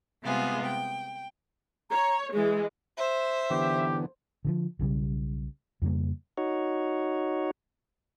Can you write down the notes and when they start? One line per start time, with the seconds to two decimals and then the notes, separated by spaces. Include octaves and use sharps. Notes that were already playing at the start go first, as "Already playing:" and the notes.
0.22 C3 G3 G#3 B3 F4 G#4
0.65 G5
1.91 C#5 A#5
2.33 E3 G#3 G#4
2.97 C5 E5
3.50 D3 E3 B3 G4
4.45 D3 E3 F3
4.79 B1 C#3 F#3 G3
5.82 F2 C#3 G3 A#3
6.38 D#4 F#4 C#5